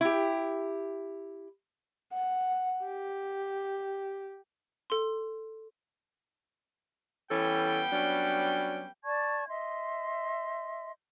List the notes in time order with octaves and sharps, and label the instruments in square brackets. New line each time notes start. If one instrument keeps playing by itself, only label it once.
[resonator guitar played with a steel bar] E4 G4
[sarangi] F#5
G4
[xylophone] A4 C6
[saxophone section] E3 C#4 A4 [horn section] G3 B3 G5
[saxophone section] F#3 C#4 D4
[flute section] D5 A5 C#6 G#6
D#5 E5 C6